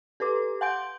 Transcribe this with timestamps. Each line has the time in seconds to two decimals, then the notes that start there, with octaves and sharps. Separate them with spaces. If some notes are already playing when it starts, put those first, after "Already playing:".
0.20 G4 A4 B4 D6
0.61 F5 F#5 G#5 C6 G6 D7